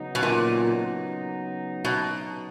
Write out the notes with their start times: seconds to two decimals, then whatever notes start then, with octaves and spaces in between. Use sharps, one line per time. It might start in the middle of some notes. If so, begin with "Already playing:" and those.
Already playing: C#3 F#3 B3 D#4
0.15 B2
0.23 A#2
1.85 B2